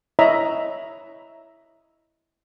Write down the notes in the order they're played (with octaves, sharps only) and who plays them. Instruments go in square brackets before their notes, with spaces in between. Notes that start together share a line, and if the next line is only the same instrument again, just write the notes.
[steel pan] E4 C#5 D#5 E5 A#5 B5